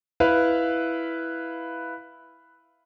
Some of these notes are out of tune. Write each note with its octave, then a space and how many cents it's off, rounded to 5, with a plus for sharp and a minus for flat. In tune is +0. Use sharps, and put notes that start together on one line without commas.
E4 +0 B4 +0 F5 +0